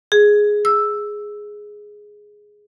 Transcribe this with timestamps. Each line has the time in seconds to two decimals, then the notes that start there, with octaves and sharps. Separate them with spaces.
0.12 G#4
0.65 E6